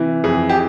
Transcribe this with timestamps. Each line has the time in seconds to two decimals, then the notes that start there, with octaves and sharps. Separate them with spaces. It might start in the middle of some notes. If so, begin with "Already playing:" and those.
Already playing: C3 E3
0.24 F2 G#4
0.49 G4